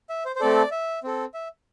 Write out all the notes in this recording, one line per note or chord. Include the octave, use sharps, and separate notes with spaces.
E5
C5
C5
A3 C4 A4 D5
E5
C4 A4
E5